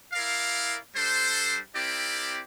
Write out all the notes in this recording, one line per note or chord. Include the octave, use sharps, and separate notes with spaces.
E4 A#4 D5 F5
G3 D4 A4 C5
C4 E4 G4 A#4 D5